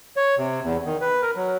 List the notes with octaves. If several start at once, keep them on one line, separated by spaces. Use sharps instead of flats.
C#5
C3
E2
D#3
B4
A#4
F#3